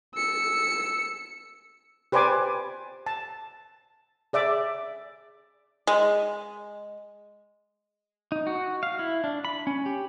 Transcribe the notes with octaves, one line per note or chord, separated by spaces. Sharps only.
E6 C#7
G4 B4 C5 D5 G#5 D6
A5
G#4 D5 E5 D6
G#3
D#4
F#4
F5
E4
D4
B5
C#4
G4